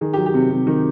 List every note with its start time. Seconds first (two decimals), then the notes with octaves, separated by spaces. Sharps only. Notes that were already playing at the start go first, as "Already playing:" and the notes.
0.01 D#3 G#4
0.13 G4
0.18 F#3
0.26 G4
0.34 C3
0.51 C3
0.67 D#3